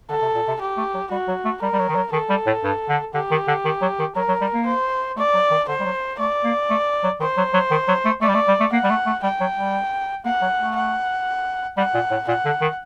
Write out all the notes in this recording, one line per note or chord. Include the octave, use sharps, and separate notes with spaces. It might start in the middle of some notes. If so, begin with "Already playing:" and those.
D3 A4
C3
A#2
C3
G4
A3
F#3
G3 F#4
F#3
A3
G3 A#4
G3
F#3
D#3
F#3
D#3 A4
G3
A2
G2
D3
D3 G4
D#3
D3
D#3
F#3
D#3
F#3 A#4
F#3
G3
A#3
C5
A3 D5
F#3
D#3
D3 C5
G3
F#3
A3 D5
A#3
A3
F#3
D#3 C5
F#3
F#3
D#3
F#3
A3
A3 D5
G3
A3
G3
A3
A#3 F#5
G3
A3
A3
G3 G5
F#3
G3
A#3 F#5
F#3
A3
F#5
G3 F#5
A#2
A2
A#2 F#5
D3
D#3